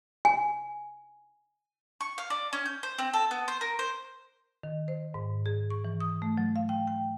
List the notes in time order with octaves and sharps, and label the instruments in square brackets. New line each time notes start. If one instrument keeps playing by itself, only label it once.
[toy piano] G#5
[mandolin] C#6
F5
D5
C#4
G6
C5
C4
A4
B3
C5
A#4
C5
[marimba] D#3
C5
G#2
G#4
C#6
E3
D#6
A3
F#3
F5
G5
G5